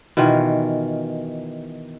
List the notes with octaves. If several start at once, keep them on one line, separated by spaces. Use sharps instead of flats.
B2 D#3 E3 F4